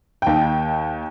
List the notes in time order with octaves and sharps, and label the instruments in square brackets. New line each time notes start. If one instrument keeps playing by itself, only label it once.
[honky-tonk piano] D#2 G5